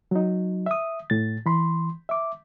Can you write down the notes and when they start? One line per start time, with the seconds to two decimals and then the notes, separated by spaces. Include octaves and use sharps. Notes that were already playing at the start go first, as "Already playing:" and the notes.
0.11 F#3 D#4
0.66 E5 D#6
1.10 A2 A6
1.46 E3 B5 C6
2.09 E5 D6